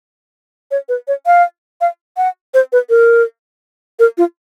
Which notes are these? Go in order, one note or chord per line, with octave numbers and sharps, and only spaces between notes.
C#5
B4
C#5
F5
F5
F#5
C5
B4
A#4
A#4
F4